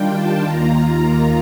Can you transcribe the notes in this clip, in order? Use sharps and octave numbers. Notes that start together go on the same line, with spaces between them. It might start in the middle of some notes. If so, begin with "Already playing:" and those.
Already playing: D#3 G3 D4 F4 G5
A5
D#2 D#3 A#3 F4 A#5